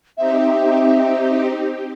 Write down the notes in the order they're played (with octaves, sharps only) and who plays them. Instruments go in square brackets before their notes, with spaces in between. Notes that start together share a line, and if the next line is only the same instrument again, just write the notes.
[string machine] C4 D#4 G4 [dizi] E5